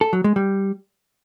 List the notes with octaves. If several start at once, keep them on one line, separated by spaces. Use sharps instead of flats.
A4
F#3
G#3
G3